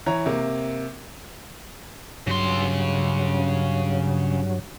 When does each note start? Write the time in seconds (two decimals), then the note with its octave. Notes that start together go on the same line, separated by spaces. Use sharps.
0.06 E3 C#5 A#5
0.26 C3 A#3
2.27 G2 C#3 F#3 C6